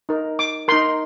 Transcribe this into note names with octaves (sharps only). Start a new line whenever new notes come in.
D#4 A#4
D6
D#4 A#4 C6